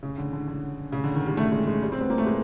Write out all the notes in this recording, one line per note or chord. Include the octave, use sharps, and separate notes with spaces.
C#3
D3
D3
D3
C#3
D3
D#3
G3
A3
G#3
G#3
G3
C4
B3
A#3
A3
G#3